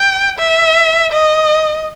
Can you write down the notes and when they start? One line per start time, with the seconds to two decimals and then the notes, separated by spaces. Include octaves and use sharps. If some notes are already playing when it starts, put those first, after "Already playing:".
Already playing: G5
0.38 E5
1.12 D#5